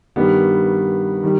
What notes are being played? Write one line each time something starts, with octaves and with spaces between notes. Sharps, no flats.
G2 D#3 G3 B3
D#3 G3